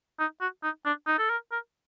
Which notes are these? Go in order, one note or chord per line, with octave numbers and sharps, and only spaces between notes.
D#4
F#4
D#4
D4
D#4
A4
A#4
A#4